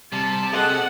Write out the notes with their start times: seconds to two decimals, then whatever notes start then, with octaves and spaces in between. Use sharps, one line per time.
0.12 C3 G3 A5
0.52 G#4 A4 D#5 F#5